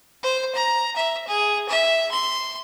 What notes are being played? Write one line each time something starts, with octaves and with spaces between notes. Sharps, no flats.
C5
A#5
E5
G#4
E5
C6